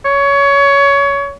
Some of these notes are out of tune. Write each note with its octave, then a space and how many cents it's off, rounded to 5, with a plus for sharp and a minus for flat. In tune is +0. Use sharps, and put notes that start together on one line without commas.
C#5 +20